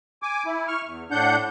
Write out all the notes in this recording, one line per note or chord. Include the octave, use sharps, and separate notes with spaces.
G#5 D6
E4
C#6 F6
E2
A2 D4 F#5 G6